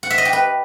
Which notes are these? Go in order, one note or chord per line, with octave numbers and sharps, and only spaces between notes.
F#5
E5
D#5
G4
B4